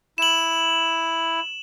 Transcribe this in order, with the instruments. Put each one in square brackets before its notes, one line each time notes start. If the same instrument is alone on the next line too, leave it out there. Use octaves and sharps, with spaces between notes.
[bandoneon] E4 [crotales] E7 F#7